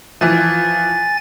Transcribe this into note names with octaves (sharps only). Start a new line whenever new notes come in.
E3 F3 G#5 A6